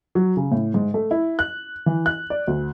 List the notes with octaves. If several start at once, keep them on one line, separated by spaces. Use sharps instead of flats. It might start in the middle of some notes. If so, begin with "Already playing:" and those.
F#3
C#3
A2
G#2
A3
E4
F#6
E3
F#6
D5
D2